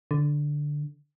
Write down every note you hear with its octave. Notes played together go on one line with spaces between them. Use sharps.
D3